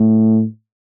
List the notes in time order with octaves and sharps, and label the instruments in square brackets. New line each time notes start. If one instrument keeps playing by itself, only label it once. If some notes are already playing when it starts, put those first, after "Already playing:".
Already playing: [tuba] A2